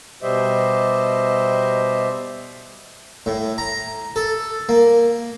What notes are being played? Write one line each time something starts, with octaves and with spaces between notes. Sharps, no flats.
B2 G3 G4 C5 D#5 E5
A2
A#5
A4
A#3